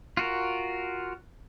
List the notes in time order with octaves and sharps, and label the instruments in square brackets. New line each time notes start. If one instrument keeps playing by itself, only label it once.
[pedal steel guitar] F4 F#4 A#4